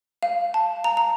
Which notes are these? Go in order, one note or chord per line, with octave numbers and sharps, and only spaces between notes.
F5
A5
A#5
A#5